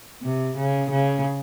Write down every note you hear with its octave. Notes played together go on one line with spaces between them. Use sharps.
C3
C#3
C#3